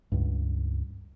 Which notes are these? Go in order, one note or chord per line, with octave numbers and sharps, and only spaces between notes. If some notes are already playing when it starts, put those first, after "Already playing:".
C#2 G2